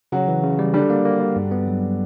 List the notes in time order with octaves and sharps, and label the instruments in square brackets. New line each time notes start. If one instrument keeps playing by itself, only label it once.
[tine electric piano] C#3 [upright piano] F#3 F#4
[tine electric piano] E3
C#3
G3
[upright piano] D3 D4 [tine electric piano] G3
[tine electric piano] A#3
A#3
G3
G2
B3
F#3